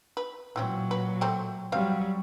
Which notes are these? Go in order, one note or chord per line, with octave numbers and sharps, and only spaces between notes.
B4
A#2 E3 F#3 C4 C#4
B4
A3 C4 G4
F#3 G3 C4 F5